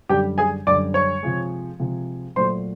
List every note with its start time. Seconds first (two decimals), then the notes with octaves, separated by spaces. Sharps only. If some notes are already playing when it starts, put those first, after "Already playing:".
0.09 F#2 D3 G3 G4 G5
0.38 G#4 G#5
0.67 F#2 D3 G3 D5 D6
0.94 C#5 C#6
1.23 C3 F3 G#3
1.80 C3 F3 G#3
2.36 A#2 F#3 A3 C5 C6